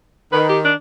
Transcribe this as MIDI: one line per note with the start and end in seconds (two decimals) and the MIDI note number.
0.32 0.69 51
0.32 0.44 71
0.49 0.59 67
0.64 0.74 62